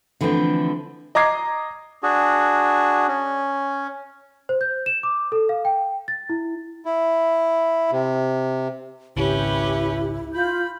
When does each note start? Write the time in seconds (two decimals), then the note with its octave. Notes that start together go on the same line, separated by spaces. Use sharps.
0.21 D3 E3 F3 A3 C4
1.15 D#5 A#5 D6 G#6 C7
2.03 D4 F#4 G#4
3.08 C#4
4.49 C5
4.61 G6
4.86 E7
5.03 D6
5.32 A4
5.49 F5
5.65 G5
6.08 A6
6.30 E4
6.85 E4
7.91 C3
9.17 G#1 C#2 C#4 E4 G4 B4
10.34 F4 B5 G6